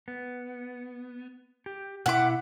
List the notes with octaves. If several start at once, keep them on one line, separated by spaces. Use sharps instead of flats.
B3
G4
B2 E4 E5 F#5 D6